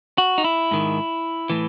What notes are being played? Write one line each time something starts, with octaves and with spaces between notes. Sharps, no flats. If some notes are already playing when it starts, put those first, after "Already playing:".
F#4
D#4
E4
G#2 D#3
A2 E3